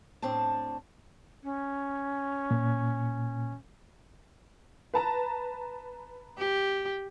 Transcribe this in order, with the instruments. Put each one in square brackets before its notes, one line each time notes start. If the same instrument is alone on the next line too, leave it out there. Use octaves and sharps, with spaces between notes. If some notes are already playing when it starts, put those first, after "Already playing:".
[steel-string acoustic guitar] A2 C4 D4 A5
[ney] C#4
[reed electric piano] A#2
[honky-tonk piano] B4 A5 A#5
[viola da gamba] G4